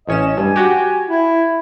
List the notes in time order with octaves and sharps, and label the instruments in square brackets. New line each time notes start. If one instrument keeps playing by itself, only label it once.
[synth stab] A1 C#4 E7 [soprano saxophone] D#5
[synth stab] G2 [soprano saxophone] G#5
[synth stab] F#4 G4
[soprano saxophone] E4